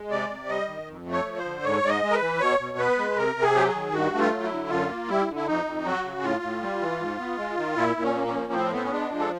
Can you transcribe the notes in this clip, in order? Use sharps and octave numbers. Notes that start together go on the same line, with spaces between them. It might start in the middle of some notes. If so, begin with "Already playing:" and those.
Already playing: G#3
C3 D5
C3
G3 D#5
D#3
F2
A3
C#5
F3
C5
D3
G#2 C#5
G#2 D5
D#5
G#3
A#4
B4
E3
B2 C#5
B2
B3 B4
G#3
C3 A#4
C3
G#4
F#3 G4
G#4
D#3
G2 F#4
A3
F4
F#3
E4
D3
F#2 F4
A#3
G3 E4
D3
E4
F2 D#4
F2
F#3 F#4
C#3
A2 F4
A2
G3
E3
G#2
B3
G#3
D#3
A#2 E4
A#2
C#4
A#3
C#4
F3
A2 C4
B3 C4
C#4
G#3 D4
F3
A4